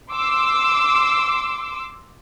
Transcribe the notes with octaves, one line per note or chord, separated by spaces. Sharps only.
C6 D6 E6